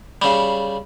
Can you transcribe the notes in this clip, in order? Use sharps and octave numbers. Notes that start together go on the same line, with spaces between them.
C#3 G3